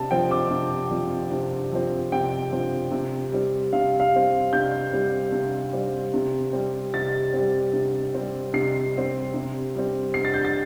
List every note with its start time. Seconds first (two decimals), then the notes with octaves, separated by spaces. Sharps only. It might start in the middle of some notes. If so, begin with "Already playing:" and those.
Already playing: C3 A5
0.11 F3 C4 G5
0.31 D6
0.51 C3
0.91 F3 C4
1.32 C3
1.72 F3 C4
2.12 C3 G5
2.52 F3 C4
2.92 C3
3.32 G3 C4
3.73 C3 F5
4.00 F5
4.13 G3 C4
4.53 C3 G6
4.93 G3 C4
5.32 C3
5.73 G3 C4
6.14 C3
6.53 G3 C4
6.94 C3 A6
7.34 G3 C4
7.73 C3
8.15 G3 C4
8.54 C3 C7
8.94 G3 C4
9.34 C3
9.75 G3 C4
10.14 C3 C7
10.25 A6
10.34 G6
10.45 A6